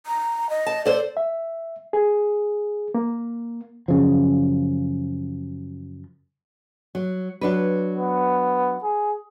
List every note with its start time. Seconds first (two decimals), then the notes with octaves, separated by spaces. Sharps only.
0.06 A#5
0.50 D#5
0.66 A5
0.86 A4 C5 D5
1.17 E5
1.93 G#4
2.94 A#3
3.88 F#2 C#3 F3
6.95 F#3
7.41 F#3 D4 B4
7.96 B3
8.84 G#4